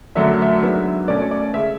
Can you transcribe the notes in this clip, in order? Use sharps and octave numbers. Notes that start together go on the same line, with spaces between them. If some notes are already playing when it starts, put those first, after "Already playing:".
F#2 D3 F#3 A3 D4 E5
E5
G#2 F#3 B3 D4
B2 A3 C#4 D5
C#5
D5
C#3 G#3 E5